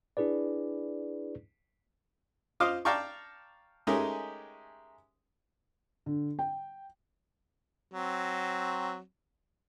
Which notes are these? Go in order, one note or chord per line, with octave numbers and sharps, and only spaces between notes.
D4 E4 G#4 B4 D5
F4 C5 D#5 F5 D6 F6
D5 F5 G5 A5 A#5 C#6
G#3 A3 C#4 D#4 G4 A#4
D3
G5
F#3 C4